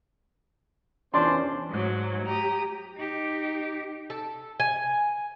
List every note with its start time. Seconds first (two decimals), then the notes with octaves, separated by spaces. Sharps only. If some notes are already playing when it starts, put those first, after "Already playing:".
1.14 E2 C#4 D4 C5 C6
1.69 G#2 F#3
2.25 G4 A#5 D#6
2.96 D#4 G4
4.10 A4
4.60 G#5